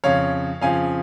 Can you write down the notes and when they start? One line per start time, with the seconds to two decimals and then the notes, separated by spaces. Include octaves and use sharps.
0.04 F2 C#3 F3 C#5 F5
0.61 F2 C#3 F3 F5 G#5